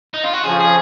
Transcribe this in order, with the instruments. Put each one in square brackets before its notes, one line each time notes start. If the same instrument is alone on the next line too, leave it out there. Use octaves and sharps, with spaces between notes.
[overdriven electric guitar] D#4
F4
F#4
[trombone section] F2 C#3 F3 [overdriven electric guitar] G#4
[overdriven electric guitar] G#4